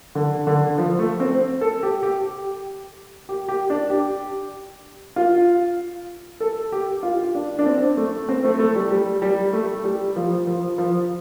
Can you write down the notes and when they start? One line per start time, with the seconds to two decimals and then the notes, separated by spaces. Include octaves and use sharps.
0.15 D3
0.47 D3
0.78 F3
0.99 A3
1.20 C4
1.61 A4
1.83 G4
2.03 G4
3.29 G4
3.49 G4
3.70 D4
3.90 G4
5.16 F4
6.40 A4
6.72 G4
7.03 F4
7.35 D4
7.59 D4
7.66 C4
7.97 A3
8.29 C4
8.44 A3
8.59 A3
8.75 G3
8.91 G3
9.22 G3
9.53 A3
9.84 G3
10.16 F3
10.47 F3
10.78 F3